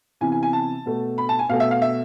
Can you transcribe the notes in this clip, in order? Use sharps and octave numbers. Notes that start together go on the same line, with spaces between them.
C3 E3 B3 G#5
G#5
G#5
A5
B2 A3
B5
A5
G#5
B2 A3 F5
E5
F5
E5